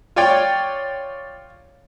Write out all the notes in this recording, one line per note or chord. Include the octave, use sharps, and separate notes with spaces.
F4 C#5 D5 G5